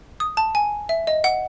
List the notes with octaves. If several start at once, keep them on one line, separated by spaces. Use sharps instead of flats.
D#6
A5
G#5
E5
D#5
F#5